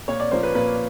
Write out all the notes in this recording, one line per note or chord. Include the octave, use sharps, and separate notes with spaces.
A#2 C#5
D5
F3 A#3 C#4 C5
B4
A#2 B4